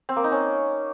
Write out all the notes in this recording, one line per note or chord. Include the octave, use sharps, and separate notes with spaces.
C4
A#3
D#4
C#4